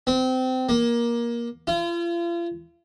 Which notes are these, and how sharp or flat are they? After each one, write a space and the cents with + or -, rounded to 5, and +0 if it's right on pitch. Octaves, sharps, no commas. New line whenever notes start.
C4 -25
A#3 +20
F4 -40